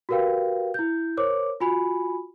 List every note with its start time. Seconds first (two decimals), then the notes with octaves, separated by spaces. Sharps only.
0.09 F#4 G4 A#4 B4 F5 G5
0.74 E4 G6
1.17 A#4 C5 C#5 D6
1.60 F4 F#4 G#5 B5